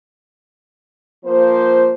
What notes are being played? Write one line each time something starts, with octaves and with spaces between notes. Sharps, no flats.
F3 A#3 C5